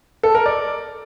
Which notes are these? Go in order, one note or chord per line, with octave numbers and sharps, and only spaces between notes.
A4
A#4
D5